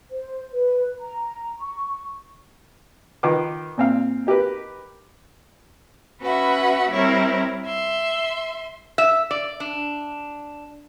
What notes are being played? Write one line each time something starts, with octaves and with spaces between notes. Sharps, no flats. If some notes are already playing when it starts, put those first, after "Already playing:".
C5
B4
A#5
C#6
D#3 F4 B4 D6
A#2 C4 F5
D#4 G4 A#4 B4
C#4 F#4 B4 E5 F#5 B5
G3 C4 E4 A#4 C#5
E5 C6
E5
D5
D4